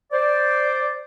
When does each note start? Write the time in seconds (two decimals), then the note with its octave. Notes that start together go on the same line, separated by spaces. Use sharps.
0.11 C5 D5